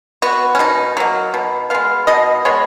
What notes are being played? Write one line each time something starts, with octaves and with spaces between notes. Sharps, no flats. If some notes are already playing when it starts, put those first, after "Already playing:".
B3 F#4
C#4
B2 D#4
F#3 A#3
B2
G#3 B3 F5
B2 D#5
G#3 B3 C#5